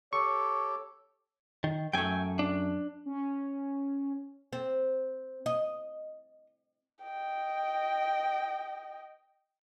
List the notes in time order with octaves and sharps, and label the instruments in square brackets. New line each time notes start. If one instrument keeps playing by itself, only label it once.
[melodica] G4 A4 [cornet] C#5 [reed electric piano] C#6
[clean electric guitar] D#3
[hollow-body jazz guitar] F#2 A3 [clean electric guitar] G5 G#5
[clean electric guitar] D4
[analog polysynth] C#4
[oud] C4
D#5
[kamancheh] D#5 G5